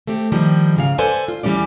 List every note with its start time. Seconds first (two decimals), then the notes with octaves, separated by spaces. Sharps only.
0.07 A3 C4 G4
0.32 D#3 F3 G3
0.76 G#2 C#3 F5
0.98 A4 B4 C5 D5 G#5
1.28 F4
1.43 D2 E3 G3 G#3 C#4 D5